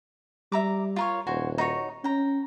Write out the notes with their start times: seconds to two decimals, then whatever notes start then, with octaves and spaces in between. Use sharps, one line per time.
0.52 G3 E5 A#5 D6
0.96 F4 A#4 C#5
1.27 D#1 F#4 C5 G#5
1.58 D#4 F#4 C#5
2.04 C#4 G5 A#5